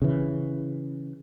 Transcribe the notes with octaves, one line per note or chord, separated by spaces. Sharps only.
C#3 E3